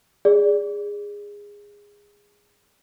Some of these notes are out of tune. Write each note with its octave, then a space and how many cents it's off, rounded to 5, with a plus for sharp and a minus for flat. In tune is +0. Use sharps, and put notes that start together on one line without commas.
G#4 -20 D5 -10